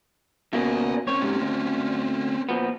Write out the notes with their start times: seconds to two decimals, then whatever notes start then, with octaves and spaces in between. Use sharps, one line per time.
0.53 B2 A#3 C#4 D5 E5
1.07 C4 C#4 C#5
1.22 G#2 C3
1.41 D2
2.49 A#2 F3 B3